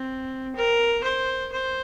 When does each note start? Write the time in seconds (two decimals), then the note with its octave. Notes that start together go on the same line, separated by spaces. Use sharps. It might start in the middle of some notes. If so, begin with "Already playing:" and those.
Already playing: C4
0.56 A#4
1.03 C5
1.52 C5